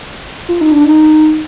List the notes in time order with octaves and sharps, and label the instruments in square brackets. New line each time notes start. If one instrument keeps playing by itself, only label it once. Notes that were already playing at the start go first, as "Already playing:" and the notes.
[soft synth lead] F4
D#4
D4
D#4